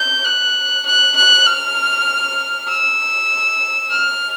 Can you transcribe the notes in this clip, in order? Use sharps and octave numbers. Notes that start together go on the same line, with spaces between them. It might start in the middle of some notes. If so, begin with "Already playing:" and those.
Already playing: G6
F#6
F#6
F#6
F6
E6
F6